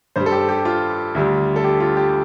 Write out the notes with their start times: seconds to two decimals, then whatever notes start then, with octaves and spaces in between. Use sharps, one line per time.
0.16 G2 G3 C5
0.26 A4
0.32 G4
0.49 G4
0.65 F4
1.15 D2 D3 G3
1.56 A4
1.64 G4
1.80 F4
1.97 G4